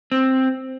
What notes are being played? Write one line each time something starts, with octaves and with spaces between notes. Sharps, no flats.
C4